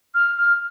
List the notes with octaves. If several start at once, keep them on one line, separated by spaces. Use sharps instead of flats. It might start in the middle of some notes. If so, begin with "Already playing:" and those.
F6
F6